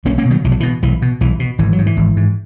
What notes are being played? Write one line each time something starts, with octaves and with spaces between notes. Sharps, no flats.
B1 A#3 C#4
A#3 C#4
B2
D#3 F#3
B1 E3
F#3
B2 E3
B1 E3
B2
B1 E3
B2
G#1 E3
F#3
G#2
E3
G#1
G#2